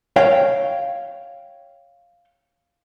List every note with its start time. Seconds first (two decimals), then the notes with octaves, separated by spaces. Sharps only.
0.16 C#5 F5 G5